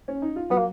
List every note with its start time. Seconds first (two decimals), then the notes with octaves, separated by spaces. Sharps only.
0.08 C#4
0.22 D#4
0.36 F4
0.50 F#3 B3 F#4
0.58 A#3